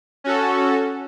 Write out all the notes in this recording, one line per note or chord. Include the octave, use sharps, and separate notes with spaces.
C#4 F#4 A4